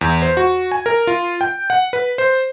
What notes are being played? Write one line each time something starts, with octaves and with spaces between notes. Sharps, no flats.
E2
C5
F#4
G#5
A#4
F4
G5
F#5
B4
C5